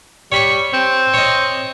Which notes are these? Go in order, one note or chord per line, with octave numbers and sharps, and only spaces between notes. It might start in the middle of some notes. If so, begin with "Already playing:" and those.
G3 C#5 B5 C#6
C4
C#5 D#5